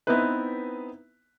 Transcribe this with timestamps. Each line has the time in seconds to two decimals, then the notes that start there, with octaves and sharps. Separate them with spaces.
0.07 B3 C4 D#4 E4 B4